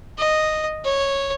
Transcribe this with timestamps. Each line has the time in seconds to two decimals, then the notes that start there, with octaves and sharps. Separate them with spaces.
0.18 D#5
0.85 C#5